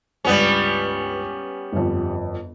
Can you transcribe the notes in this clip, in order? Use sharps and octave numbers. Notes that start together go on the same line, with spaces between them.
C#2 G2 G3 B3 C#4
G1 F2